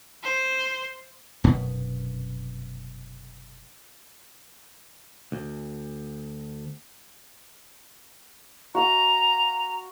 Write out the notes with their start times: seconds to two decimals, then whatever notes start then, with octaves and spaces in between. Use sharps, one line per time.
0.24 C5
1.44 F1 F#2 B2 B3
5.32 D2
8.75 F#4 F5 F#5 A#5